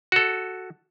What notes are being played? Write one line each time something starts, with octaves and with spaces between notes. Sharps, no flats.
F#4 A4